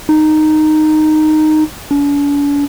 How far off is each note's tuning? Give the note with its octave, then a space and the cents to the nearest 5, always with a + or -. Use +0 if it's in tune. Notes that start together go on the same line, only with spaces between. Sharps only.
D#4 -10
D4 -45